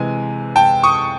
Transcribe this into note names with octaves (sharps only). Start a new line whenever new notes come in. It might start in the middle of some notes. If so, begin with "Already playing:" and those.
Already playing: C3 E3 G#3 G#5
G5 A5
C#6 D#6